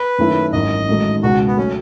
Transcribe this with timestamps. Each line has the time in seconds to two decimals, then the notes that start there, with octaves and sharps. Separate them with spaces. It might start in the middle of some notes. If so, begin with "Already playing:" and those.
Already playing: B4
0.18 F#2 D#3 A3 C#4 E4
0.53 G#1 F#2 E3 D#5
0.88 A1 G#2 D#3 F#3 A3
1.23 C#2 B2 G#3 F#4
1.47 B3
1.57 F#3 A3 C#4